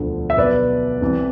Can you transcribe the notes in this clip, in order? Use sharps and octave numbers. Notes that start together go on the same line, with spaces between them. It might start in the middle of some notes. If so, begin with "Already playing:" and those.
Already playing: E1 D2 D3 F3
E5
B1 B2 B4 D5
C2 C3 E3